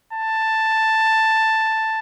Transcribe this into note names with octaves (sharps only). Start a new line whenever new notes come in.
A5